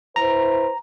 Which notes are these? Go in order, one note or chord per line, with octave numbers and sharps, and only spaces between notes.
E4 B4 C5 A#5